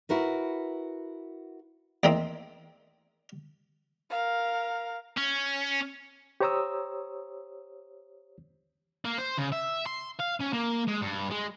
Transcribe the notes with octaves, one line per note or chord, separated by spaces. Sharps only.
E4 F#4 A#4 B4
E2 D#3 A3 A#3 C4 D#5
A#4 F5
C#4
G4 C5 C#5 A#5 D#6 E6
A#3
C5
C#3
E5
C6
F5
C#4
A#3
G#3
G2
G#3